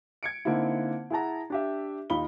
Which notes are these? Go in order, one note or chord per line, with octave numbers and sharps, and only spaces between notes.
G#6 C#7 D7
D3 A#3 C4 D#4 E4
E4 G#4 F#5 A5 A#5
D4 G4 E5
D#2 D#4 F4 B5 G7